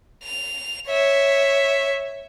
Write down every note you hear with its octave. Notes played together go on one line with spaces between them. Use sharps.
F7
C#5 E5